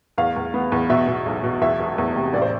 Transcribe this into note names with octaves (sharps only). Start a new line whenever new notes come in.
E2 F5
E2
B3
E2
B2 E5
B2
B1
B2
E2 E5
E1
E2
C3
A1 D5
C5